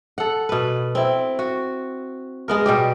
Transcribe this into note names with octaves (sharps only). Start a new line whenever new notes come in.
A4 F#5
B2 B4
C4 E4
F#4
G#3 B3 A#4
B2 G3 G4